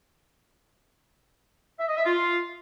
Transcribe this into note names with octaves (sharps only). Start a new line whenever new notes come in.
E5
D#5
E5
F4